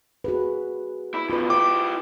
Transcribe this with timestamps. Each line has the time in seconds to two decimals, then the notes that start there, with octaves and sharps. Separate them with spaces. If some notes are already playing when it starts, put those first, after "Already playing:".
0.24 F#4 G#4 B4
1.14 E4
1.30 D#2 B2 F4 B4
1.50 E4 G4 D6